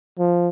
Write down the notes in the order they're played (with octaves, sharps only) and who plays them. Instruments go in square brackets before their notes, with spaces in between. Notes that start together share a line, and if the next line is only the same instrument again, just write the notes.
[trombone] F3